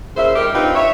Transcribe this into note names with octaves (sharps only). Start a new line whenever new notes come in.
A#2 C#3 C5 E5
D#3 G3 G4 A#4
C4 D4 D#4 F4 G4 B4
C#5 E5